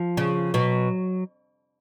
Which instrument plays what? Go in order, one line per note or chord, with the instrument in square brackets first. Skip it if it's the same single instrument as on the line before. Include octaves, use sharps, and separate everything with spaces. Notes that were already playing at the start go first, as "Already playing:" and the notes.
Already playing: [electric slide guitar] F3
[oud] C#3
[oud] B2 [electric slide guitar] F#3